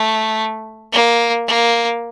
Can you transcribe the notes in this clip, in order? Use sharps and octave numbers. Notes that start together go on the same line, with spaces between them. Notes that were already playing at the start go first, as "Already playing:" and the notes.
Already playing: A3
A#3
A#3